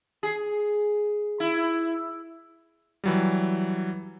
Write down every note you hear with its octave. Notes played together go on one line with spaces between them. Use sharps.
G#4
E4
E3 F#3 G3